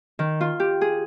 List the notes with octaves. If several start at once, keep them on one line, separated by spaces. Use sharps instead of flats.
D#3
F4
G4
G#4